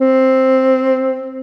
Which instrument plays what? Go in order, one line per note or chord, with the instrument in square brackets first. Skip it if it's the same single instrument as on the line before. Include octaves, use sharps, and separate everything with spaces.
[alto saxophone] C4